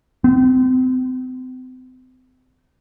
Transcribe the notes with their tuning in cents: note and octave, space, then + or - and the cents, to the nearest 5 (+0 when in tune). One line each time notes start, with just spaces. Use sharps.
C4 -40